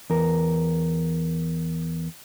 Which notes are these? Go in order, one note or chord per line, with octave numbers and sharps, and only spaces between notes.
E2 A#4